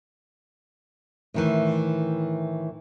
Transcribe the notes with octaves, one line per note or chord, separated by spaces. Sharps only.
A2 D#3 E3